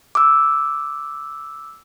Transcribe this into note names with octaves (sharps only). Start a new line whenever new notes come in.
D6 E6